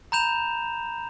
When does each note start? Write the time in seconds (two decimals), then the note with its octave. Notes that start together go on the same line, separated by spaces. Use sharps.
0.12 A#5 B5 G6 E7 F7